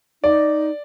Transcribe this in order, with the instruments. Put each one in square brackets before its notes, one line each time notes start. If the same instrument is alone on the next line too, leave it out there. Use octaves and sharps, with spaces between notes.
[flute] D#4 [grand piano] D5